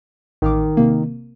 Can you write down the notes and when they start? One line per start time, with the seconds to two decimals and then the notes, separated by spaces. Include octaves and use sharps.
0.42 A1 D#3 F5 D6
0.77 C3 A#3